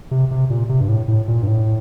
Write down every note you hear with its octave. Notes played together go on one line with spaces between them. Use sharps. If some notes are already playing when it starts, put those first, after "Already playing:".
C3
C3
A#2
C3
G2
A2
A2
A#2
G2
A2